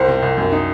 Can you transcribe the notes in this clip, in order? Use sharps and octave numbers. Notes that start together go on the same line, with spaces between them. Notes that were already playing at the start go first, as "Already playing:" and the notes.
Already playing: C2 C5
C3
C2
F#2
D#4